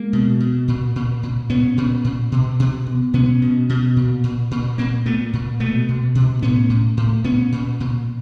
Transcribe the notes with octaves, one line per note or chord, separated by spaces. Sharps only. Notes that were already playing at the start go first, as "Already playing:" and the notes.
Already playing: G#3 A#3
B2
B2
A#2
A#2
A#2
A#2 B3 C#4
A#2
A#2
B2
B2
B2
B2 B3 C#4
B2
B2
A#2
A#2
A#2
A#2 A#3 C4
A#2 A3 B3
A#2
B2 A3 B3
B2
B2
A2 B3 C#4
A2
A2
A#2 B3 C#4
A#2
A#2